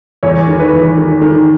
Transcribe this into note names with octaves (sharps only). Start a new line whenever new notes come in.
E2 C#5
D#3
B4
E2
D#3
D#3